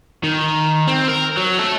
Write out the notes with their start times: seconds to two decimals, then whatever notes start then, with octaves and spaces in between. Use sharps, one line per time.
0.23 D#3
0.87 C4
1.08 A#4
1.37 F#3
1.59 A4 E5